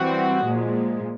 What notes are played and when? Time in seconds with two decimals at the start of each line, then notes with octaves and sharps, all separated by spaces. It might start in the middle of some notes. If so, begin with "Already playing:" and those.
Already playing: E3 G3 C4 F#4
0.44 A#2 F3 G#3